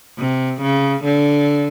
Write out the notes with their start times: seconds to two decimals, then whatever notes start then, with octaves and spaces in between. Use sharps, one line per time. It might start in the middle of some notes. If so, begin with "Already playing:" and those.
0.19 C3
0.61 C#3
1.04 D3